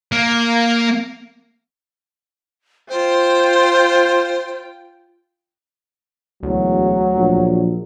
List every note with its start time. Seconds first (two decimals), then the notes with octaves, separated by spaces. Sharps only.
0.12 A#3
2.89 F4 C5 G5
6.43 E1 D2 F#3
7.16 A#1